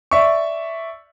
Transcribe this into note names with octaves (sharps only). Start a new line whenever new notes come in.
D5 E5 C#6